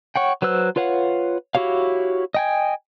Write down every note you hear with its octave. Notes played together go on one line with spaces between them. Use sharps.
C#5 F#5 G5
F#3 B4 C5 E6 F#6
F4 B4 C#5 F5 F#5
E4 F#4 G4 C#5 F5
D#5 G5 G#5